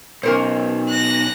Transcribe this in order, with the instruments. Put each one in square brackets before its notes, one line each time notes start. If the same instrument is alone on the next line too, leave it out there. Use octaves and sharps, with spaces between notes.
[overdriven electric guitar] B1 [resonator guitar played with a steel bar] C#4 A#4 C5
[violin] F#6 A#6